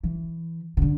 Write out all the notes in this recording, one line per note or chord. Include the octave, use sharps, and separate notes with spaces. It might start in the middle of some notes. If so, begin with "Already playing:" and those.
E3
C3
D3